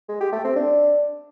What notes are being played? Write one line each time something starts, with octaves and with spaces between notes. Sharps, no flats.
G#3
G4
A3
C4
D4